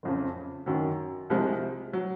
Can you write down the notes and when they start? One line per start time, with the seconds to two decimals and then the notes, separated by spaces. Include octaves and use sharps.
0.03 F#1 F2 C#3
0.66 F#2 D#3 F#3
1.30 C2 C3 F3 G#3
1.93 F#3